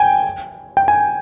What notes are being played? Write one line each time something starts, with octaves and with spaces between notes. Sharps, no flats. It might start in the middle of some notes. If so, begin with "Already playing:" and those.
Already playing: G5 G#5
G5
G#5